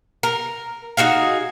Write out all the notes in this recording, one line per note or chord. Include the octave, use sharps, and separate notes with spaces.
A#4
D#4 F#4 G#4 F5